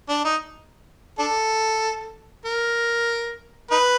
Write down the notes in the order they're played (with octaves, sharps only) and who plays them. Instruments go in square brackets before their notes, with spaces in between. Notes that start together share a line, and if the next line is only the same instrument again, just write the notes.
[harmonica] D4
D#4
D4 A4
A#4
D#4 B4